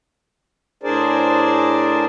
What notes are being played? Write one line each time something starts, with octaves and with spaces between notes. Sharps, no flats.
A2 D4 G#4 A#4 C5 D5